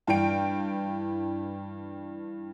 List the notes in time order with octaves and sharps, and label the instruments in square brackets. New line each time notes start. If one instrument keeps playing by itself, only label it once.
[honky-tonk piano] G2 E3 D4 G5 D7